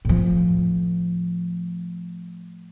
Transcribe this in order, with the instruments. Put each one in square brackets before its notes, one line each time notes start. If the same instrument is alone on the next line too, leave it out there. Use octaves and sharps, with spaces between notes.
[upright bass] A2 F3